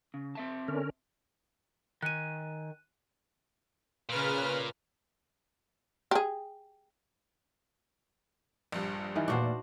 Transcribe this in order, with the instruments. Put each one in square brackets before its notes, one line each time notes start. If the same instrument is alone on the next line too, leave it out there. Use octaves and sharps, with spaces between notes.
[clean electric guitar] C#3
C4 E5 A5
[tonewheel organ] D3 C#4 A#4
[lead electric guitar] D#3 G#5 [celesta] F#6 D#7
[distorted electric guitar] A#2 [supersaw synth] C#3 B4 F6
[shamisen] G4 G#4
[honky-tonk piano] A#1 G2
[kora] D#3 E3
[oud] E2 A#2 [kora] D4 F#4 C5